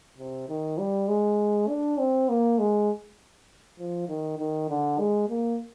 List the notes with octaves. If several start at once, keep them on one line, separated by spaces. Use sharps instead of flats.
C3
D#3
G3
G#3
D4
C4
A#3
G#3
F3
D#3
D#3
D3
G#3
A#3